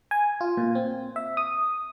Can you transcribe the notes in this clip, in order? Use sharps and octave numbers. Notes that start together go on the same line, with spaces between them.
G#5
F4
A#2
C4
E5
D#6